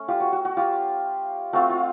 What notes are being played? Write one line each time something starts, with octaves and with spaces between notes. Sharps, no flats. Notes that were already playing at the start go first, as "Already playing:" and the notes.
Already playing: A3 C#4
F4 G4
F#4
F#4
F#4
F4 G4
A3 C4 F4 F#4
F4